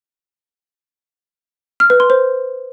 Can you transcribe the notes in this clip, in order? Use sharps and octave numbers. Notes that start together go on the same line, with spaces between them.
F6
B4
C6
C5